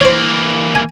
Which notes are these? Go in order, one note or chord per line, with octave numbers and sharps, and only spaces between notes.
E3 A#3 C5 C#5
G#5